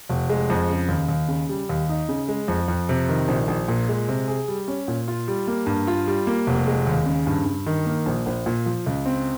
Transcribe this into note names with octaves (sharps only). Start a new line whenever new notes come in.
F1
G#3
F2
C#3
D#2
D#2
C#3
G3
D#2
D#4
C#3
G#3
F2
F2
C3
D#3
A#1
A#1
A#2
G#3
C3
G#4
G3
C#4
A#2
F4
G3
A#3
G2
F4
G3
A#3
F1
G#3
D#2
C#3
G2
G2
D#3
A#3
A#1
A#1
A#2
F3
C#2
C4